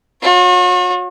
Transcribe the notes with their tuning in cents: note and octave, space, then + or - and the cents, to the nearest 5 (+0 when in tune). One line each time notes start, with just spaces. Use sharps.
F#4 -45 C#5 -5